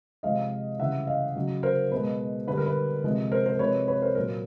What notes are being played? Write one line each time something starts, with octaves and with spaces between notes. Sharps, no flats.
C3 F3 G#3 D#5 F5
C#3 E3 G3 E5 F#5
D#5 F5
C#3 F#3
A#4 C5
B2 G#3 B4
D3 G3 B4
A#4
B4
C3 F3 G#3
A#4 C5
A#4 C5
C3 F3 G#3 B4 C#5
B4 C#5
A#4 C5
A#2 F#3 A#4